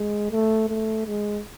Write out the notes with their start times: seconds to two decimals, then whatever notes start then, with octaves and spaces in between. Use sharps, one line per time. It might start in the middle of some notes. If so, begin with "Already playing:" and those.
Already playing: G#3
0.31 A3
0.69 A3
1.07 G#3